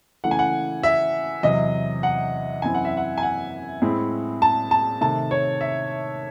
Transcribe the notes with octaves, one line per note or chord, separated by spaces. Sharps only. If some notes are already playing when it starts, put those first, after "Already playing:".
C#3 E3 A3 F#5
G#5
F#5
E5
E2 C3 F#3 D#5
F#5
F#2 E3 C4 E4 G#5
F#5
E5
F#5
G#5
F#5
A2 G#3 C4 E4
A5
A5
C3 D#3 A3 A5
C#5
E5